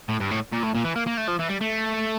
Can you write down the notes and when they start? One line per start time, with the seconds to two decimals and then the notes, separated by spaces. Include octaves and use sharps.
0.09 A2
0.21 G2
0.31 A2
0.53 A#2
0.64 A2
0.75 A#2
0.84 E3
0.96 A#3
1.07 A#3
1.17 A3
1.28 F3
1.39 E3
1.49 G3
1.61 A3